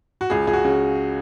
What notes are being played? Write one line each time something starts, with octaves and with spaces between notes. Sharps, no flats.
F#4
C#2 G#4
C#2 G#4
F#4
C#3